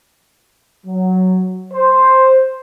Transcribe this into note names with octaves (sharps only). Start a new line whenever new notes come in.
F#3
C5